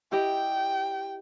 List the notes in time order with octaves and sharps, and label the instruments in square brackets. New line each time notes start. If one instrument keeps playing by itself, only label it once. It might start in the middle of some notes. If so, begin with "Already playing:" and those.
[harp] E4 G4 D#5 [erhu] G5